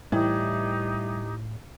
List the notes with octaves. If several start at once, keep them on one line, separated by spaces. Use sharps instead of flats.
A2 E3 G3 D#4 G4